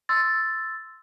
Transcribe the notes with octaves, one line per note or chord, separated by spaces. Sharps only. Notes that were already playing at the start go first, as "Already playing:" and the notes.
C6 E6 A6